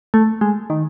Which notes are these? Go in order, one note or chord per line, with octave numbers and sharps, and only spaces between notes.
A3
G#3
D#3